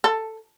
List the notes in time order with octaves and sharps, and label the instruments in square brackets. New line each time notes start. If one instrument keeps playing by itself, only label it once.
[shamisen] A4